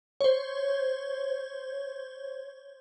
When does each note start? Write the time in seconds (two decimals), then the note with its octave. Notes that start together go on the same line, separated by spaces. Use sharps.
0.21 C5 C#5